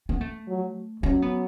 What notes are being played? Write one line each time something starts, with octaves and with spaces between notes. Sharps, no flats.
B3
A3
F#3
F#3 C#4
B3